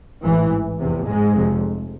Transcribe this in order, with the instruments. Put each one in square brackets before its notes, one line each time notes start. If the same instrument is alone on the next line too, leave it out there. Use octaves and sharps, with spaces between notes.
[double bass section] A1 G#2 E3
F1 E2 C3
G#2 G#3
F1 F2 C3